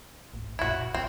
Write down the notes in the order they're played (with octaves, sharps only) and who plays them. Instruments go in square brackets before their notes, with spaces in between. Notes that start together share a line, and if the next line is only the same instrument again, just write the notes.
[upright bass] G#1 D2
[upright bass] F1 A#2 [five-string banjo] E4 F#4
[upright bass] A#2
[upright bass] D#1 C#2 [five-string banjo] C4